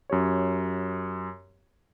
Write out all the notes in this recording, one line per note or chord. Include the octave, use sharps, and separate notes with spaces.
F#2 G4 C#5